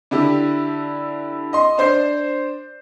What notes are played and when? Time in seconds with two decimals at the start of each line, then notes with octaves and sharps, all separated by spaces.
0.11 D3 E4 G4
1.53 D#5 C6
1.78 D4 C5 G6 C7